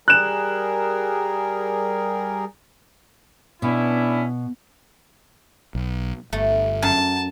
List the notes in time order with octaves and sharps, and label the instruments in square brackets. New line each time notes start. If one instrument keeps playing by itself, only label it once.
[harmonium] G3 G#4 A#4 [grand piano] F#6 E7
[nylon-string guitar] B2 [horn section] C#4 D4 E4
[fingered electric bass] B1
[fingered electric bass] G1 [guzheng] A3
[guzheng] F#2 [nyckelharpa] A5